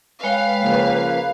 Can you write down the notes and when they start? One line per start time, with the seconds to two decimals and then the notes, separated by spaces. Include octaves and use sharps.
0.24 G#3 B4 C#5 F5 G5
0.62 C#3 F3 A#3